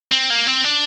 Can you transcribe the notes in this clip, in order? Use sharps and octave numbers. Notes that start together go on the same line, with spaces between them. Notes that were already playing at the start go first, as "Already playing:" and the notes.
C4
A#3
C4
D4